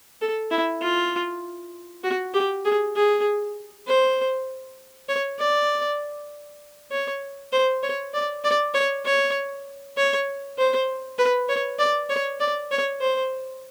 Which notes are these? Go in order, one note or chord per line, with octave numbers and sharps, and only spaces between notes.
A4
E4
F4
F#4
G4
G#4
G#4
C5
C#5
D5
C#5
C5
C#5
D5
D5
C#5
C#5
C#5
C5
B4
C#5
D5
C#5
D5
C#5
C5